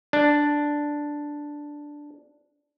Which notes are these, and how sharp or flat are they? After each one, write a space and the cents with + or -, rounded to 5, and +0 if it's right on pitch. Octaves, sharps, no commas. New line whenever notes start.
D4 +0